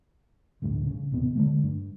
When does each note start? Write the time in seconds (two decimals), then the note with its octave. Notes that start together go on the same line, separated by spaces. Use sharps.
0.62 A1 D2 G2
0.87 C#3
1.11 D#1 A1 C3 B3
1.35 D3 G#3 A3
1.63 G2